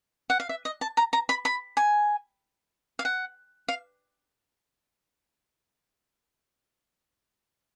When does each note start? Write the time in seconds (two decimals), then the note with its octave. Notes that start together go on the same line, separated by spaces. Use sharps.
0.30 F#5
0.40 F5
0.49 E5
0.65 D#5
0.81 A5
0.97 A#5
1.13 A#5
1.29 B5
1.45 B5
1.77 G#5
2.99 F5
3.05 F#5
3.68 F5